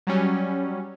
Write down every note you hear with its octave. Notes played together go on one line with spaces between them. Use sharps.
F#3 G3 C#4